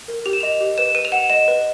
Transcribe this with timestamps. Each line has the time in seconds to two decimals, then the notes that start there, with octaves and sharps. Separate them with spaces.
0.08 A#4
0.26 G4 F7
0.33 E7
0.41 D#5 F7
0.61 G4
0.78 B4 E7
0.95 B4 D#7
1.05 F7
1.12 F#5 E7
1.30 D#5 E7
1.48 B4